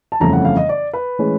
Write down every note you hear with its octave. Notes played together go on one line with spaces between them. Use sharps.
A5
G1 F2 C#3 E3 A3 A#5
F#5
F5
D#5
D5
B4
A2 E3 G#3 C#4